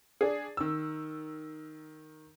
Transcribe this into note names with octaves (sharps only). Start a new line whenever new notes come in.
D4 G#4
D#3 E6